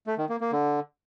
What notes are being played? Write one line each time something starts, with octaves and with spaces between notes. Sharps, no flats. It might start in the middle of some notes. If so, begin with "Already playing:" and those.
A3
D#3
A#3
A#3
D3